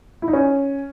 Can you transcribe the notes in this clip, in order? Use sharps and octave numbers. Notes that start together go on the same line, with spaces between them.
E4
D#4
C#4